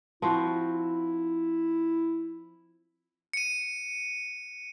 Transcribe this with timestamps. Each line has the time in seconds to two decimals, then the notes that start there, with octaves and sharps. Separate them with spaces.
0.22 F3 C4 E4 F#4
3.33 C#7 D#7